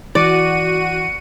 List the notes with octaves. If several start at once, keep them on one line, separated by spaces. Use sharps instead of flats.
E3 F#4 D5 C#7 D#7